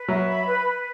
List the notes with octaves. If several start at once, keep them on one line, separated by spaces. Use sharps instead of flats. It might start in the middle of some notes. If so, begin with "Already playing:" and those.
Already playing: B4
F#3 E5
B5
B4
B4